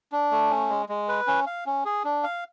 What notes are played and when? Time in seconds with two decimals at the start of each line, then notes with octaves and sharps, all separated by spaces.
0.12 D4
0.31 A3
0.50 C#4
0.70 G#3
0.89 G#3
1.08 B4
1.27 C#4
1.47 F5
1.66 C#4
1.85 G#4
2.04 D4
2.23 F5